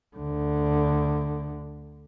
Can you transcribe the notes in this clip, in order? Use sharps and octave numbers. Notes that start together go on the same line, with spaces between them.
D2 D3